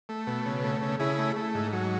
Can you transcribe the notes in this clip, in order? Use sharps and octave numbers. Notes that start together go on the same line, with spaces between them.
A3
B2
C#3
A3
C#3
C#3 E4 G#4
A3
A3
G#2
F#3